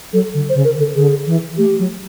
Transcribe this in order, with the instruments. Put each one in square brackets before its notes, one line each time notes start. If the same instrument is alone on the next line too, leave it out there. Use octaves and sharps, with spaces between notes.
[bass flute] F#3 [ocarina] A4
[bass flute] D3
[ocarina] C5
[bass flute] C#3
[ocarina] A#4
[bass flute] D3
[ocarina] A4
[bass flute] D3 [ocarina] G#4
[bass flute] E3
[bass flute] A3 [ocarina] G4
[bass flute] F#3